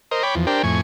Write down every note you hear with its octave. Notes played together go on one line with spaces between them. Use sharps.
A#4 C5 D#5
C#5 G5 B5 D6
E2 F3
D4 G4 A#4 C5 G5
F2 A2 G#5 C#6